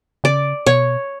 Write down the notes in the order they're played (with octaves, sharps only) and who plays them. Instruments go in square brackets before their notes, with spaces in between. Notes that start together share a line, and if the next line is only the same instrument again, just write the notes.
[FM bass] C#3 [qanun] D5
[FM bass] B2 [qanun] C#5